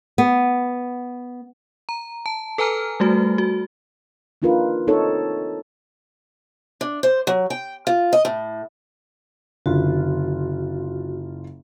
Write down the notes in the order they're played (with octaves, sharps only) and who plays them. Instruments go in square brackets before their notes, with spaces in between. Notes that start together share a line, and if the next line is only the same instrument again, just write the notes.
[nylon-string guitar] B3
[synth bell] A#5
A5
A4 B4 G#5 A#5 F6
G3 A3 F#4
F#4
[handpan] A#3 D4 D#4 F4 A#4 B4
C4 D#4 A4 C#5
[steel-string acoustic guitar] D4
C5
F#3
G5
F4
D#5
A2
[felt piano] F#1 F4 [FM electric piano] D3 [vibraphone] F#4